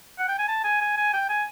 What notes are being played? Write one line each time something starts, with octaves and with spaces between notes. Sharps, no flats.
F#5
G5
G#5
A5
G#5
G#5
G#5
G5
G#5